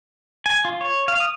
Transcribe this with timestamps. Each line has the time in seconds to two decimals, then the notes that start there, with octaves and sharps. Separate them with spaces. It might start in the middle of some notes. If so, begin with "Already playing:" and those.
0.46 G#5
0.65 F4
0.81 C#5
1.08 F5
1.20 D#6